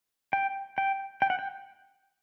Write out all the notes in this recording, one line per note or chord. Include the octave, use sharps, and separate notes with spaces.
G5
G5
G5
F#5
G5